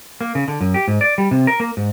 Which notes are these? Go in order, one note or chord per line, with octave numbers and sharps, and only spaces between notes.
A#3
C#3
D3
F#2
G4
G#2
D5
G3
C3
A#4
A#3
G#2